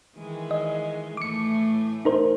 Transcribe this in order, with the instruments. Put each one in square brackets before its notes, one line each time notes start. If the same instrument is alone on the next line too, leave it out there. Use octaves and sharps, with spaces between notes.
[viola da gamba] D#3 E3 G#3
[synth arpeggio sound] D#5
[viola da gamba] A2 E3 A3 [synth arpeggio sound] D6 C#7
[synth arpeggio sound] D#4 A#4 C5